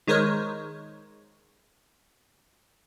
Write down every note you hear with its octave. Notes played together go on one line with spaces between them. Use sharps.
D#3 G#3 A#4 C5 C#5